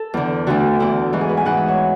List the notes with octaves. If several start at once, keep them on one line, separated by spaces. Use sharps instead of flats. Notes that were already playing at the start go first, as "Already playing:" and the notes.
Already playing: A4
E2 D3
D2 D3 F#4
E2 D3 E4
G#2 E3 F#4
G#4
B4
G#5
G#2 E3 F#5
E5
C#5